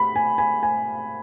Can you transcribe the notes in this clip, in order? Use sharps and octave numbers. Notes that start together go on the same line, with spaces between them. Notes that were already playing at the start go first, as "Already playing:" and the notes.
Already playing: B5
G#5
G#5
G#5